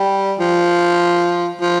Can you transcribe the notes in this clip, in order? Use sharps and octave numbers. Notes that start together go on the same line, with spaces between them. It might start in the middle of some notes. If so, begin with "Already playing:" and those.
Already playing: G3
F3
F3